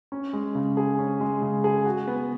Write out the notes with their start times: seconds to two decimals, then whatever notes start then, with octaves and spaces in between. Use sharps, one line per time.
0.12 C#4
0.33 G#3
0.55 C#3
0.77 G#4
0.99 C#4
1.21 G#3
1.42 C#3
1.64 G#4
1.85 F#4
2.07 B3